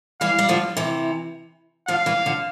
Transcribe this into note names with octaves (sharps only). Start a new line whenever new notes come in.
E3 G3 F5
G3
D3 F3
C3 E3
D3 F3 F5
E3 G3
D3 F3